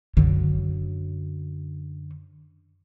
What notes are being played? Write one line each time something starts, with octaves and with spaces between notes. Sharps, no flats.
F#2 D3